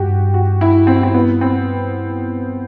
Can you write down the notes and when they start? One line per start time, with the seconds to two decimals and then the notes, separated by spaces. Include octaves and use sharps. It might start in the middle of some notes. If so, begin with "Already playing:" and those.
Already playing: G2 F#4 G4
0.34 F#4
0.61 E4
0.87 C4
1.03 C4
1.14 B3
1.41 C4